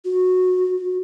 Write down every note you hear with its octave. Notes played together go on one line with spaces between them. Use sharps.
F#4